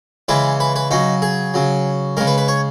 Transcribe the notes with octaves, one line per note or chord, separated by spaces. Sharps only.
C#3 E3 G#3 B4
B4
B4
C#3 F#3 D#4
G#4
C#3 F#3
C#3 G#3 A#4
B4
B4
C#5